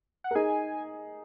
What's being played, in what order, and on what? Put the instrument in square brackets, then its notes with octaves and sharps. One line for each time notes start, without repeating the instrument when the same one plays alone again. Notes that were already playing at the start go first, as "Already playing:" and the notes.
[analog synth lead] F#5
[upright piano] A#4
[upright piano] D#4 G#4 [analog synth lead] G#5